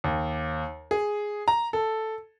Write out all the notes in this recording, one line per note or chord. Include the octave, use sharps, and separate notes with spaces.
D#2
G#4
A#5
A4